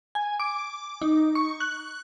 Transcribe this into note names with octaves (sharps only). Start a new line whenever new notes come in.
G#5
D6
D#4
C#6
F#6